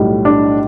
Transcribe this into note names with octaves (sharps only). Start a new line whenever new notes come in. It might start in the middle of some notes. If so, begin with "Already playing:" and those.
Already playing: B1 A2 G3
D4